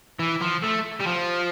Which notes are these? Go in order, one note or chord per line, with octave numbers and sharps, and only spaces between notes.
E3
F3
A3
G3
F3